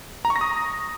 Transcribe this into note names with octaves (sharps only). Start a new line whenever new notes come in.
A#5
C#6
A#6
D#6